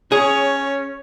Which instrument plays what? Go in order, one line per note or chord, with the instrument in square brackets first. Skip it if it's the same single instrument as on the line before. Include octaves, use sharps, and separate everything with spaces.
[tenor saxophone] C#4 [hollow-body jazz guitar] G#4 [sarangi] C#5